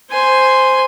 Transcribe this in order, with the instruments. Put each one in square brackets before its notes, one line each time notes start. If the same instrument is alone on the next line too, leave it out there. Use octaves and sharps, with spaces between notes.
[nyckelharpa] C5 G#5